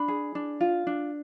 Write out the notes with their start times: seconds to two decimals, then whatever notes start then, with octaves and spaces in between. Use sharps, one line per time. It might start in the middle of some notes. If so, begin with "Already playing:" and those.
Already playing: D4 B5
0.08 G#4
0.35 D4
0.61 F4
0.87 D4